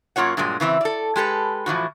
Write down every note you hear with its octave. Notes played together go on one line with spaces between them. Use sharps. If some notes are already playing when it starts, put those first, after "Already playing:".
F#2 A#3 F4 C#5 F#5
G2 A#2 F#3 G#3
C#3 E3 C4 E5
A4 D5
G#3 G4 A4 B4
A2 E3 F3 F#4